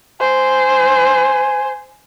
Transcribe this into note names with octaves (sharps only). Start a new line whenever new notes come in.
C5 G#5